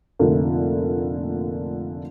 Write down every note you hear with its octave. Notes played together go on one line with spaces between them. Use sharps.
F1 A#2 D3 A3 A#3